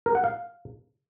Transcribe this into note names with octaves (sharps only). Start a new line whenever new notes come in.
A#4
F#5
F5